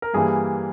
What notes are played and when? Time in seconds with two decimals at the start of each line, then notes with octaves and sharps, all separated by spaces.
0.02 A#4
0.13 G2 E3 G3 A#3 G#4